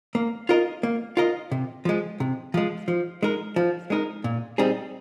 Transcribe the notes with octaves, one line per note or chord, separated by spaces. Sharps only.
A#3
F4 A#4 D#5
A#3
F4 A#4 D#5
C3
F3 G#3
C3
F3 G#3
F3
G#3 D#4 A#4
F3
G#3 D#4 A#4
A#2
G3 C4 D#4 G#4